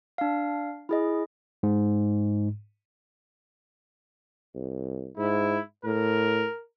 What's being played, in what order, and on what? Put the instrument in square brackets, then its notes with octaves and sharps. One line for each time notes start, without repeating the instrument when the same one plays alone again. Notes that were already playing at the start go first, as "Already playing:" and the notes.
[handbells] D4 F5
E4 G#4 D#5
[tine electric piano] G#2
[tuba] C2
[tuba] G#2 [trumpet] E4
[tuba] A2 [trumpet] A#4